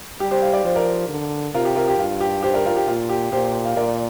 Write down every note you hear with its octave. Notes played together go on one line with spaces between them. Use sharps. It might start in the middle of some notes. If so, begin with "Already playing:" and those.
G3 G4
G4 C5
C5 F5
D5
F3 C5
A#4 D5
D3
C3 F4 A#4
G4
F4 A#4
G4
G2 F4
G4
G4 C5
A#4 D5
F4 A#4
G4
A#2 F4
G4
A#2 G4 C5
F5
A#2 A#4 D5